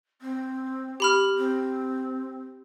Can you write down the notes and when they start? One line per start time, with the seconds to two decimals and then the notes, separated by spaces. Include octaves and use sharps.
0.22 C4
1.00 G4 B5 F6
1.38 C4